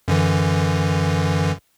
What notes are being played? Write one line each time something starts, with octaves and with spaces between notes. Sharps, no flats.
F#2 D3 E3